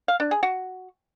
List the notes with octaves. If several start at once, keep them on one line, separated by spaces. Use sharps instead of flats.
F5
D4
G#4
F#4